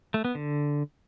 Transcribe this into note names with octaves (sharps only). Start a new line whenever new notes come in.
A3
B3
D3